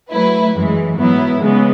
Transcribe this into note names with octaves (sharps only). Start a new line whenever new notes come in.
F#3 A3 E4 B4
F#2 E3 G#3
G#2 F#3 B3 E4
C#3 E3 G#3 B3